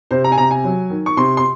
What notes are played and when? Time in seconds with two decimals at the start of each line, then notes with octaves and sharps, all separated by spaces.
0.11 C3 C5
0.24 A#5
0.32 G#5
0.38 C3 A#5
0.51 G#5
0.64 F#3
0.90 D#3
1.06 C#6
1.17 C3 C6
1.37 C6